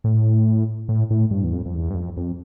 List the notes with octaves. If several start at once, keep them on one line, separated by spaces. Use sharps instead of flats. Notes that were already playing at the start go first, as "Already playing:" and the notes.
A2
A2
A2
G2
E2
F2
F2
E2
G2
F2
F2